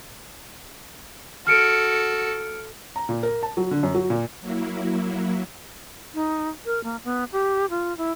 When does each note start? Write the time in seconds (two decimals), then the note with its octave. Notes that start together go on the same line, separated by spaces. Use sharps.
1.47 F#4 A4 F6 C#7 D7
2.96 A#5
3.09 A#2
3.23 A#4
3.43 A5
3.57 F#3
3.71 D3
3.83 F#2
3.95 F#3
4.10 A#2
4.41 F#3 A#3 E4
6.14 D#4
6.65 A#4
6.84 A#3
7.04 B3
7.32 G4
7.70 F4
7.97 E4